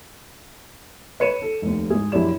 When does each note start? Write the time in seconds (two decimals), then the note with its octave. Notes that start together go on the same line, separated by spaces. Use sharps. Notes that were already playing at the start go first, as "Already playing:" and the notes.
1.20 B4 C#5 C#7 D#7 E7
1.42 A4
1.62 F1 D#2
1.90 G#2 G#4
2.12 A#1 F#2 E4 G4 D5 E7